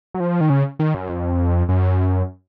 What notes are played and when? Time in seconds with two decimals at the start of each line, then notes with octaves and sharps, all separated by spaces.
0.14 F#3
0.20 F3
0.41 D#3
0.50 C#3
0.79 D#3
0.95 F#2
1.09 F2
1.69 F#2